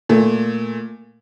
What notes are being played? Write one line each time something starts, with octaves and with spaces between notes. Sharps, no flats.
A#2 A3